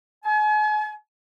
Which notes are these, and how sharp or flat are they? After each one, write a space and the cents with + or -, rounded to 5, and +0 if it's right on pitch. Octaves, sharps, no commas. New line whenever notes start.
G#5 +40